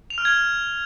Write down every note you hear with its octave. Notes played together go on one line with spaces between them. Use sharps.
F7
F6
G#6